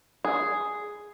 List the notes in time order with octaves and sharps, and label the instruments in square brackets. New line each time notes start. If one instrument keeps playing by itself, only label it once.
[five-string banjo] G#4